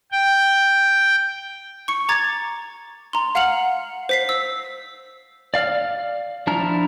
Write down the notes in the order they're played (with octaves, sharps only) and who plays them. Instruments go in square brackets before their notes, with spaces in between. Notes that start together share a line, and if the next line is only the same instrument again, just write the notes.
[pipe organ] G5
[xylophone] C#6 C#7
A#5 D6 G#6 A6
A#5 C6
F5 F#5 F6 C#7 F7 F#7
C5 B6 C7
E6
[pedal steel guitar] D5 F5 F6
F3 D4 E4 A#5 F6